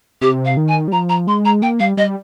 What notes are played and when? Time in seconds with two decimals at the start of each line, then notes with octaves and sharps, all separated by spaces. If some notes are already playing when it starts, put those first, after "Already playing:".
0.21 C3 G4
0.45 F5
0.57 D#3
0.68 G#5
0.88 G3
0.92 F3 A#5
1.09 A#5
1.27 G#3 C6
1.45 A#5
1.62 A#3 G5
1.80 G3 F5
1.97 G3 D#5